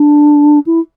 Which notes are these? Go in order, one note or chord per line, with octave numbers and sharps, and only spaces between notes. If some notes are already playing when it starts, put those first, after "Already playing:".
Already playing: D4
E4